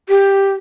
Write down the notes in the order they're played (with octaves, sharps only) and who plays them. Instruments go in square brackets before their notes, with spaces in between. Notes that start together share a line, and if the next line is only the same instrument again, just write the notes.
[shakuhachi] G4